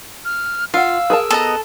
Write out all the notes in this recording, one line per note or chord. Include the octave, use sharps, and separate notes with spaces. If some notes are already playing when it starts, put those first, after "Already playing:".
F6
F4 F5 F#5 E6
G#4 A#4 A5
B3 A4 D#5 A#5